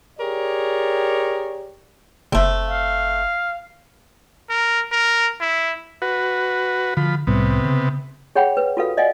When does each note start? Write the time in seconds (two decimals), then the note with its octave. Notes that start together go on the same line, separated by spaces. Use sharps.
0.19 G4 G#4 A#4 C#5 D5
2.32 F#1 A3 C4
2.68 F5
4.49 A#4
4.92 A#4
5.40 E4
6.02 F#4 B4
6.97 D3 F3 B5
7.27 C2 A2 C3 G3 B3
7.65 C#3
8.36 G#4 C#5 F#5 G5 B5
8.57 B4
8.77 F4 F#4 A4 B4 F5
8.97 D5 D#5 F5 F#5 G#5